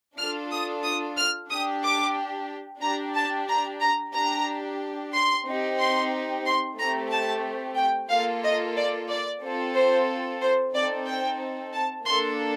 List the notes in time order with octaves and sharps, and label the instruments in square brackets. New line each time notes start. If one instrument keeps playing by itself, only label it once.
[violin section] D4 F4 A4 F6
D#6
D#6
F6
D4 G4 D#6
D6
D4 G4 A#5
A5
A#5
A#5
D4 G4 A#5
C6
C4 D#4 G4
C6
C6
A3 C4 G4 A#5
A5
G5
A#3 F4 A4 F5
D#5
D5
D5
C4 F4 A4
C5
C5
C4 D#4 A4 D5
G5
A5
A#3 D4 A4 C6